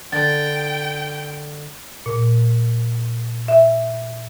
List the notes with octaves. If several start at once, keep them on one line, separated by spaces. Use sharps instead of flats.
D3 G5 A6
A#2
E5